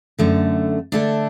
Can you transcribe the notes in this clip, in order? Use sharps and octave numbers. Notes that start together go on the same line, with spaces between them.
F#2 D3 A3
D3 A3 D4